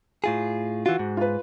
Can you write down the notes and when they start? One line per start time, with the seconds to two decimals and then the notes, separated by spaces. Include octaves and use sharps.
0.24 A2 F4 G#4
0.86 E3 F4 F#4
0.99 G#2
1.17 F4 B4